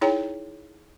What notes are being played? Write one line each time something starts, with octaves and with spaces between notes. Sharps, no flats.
D#4 E4 G#4 C#5 G5 A#5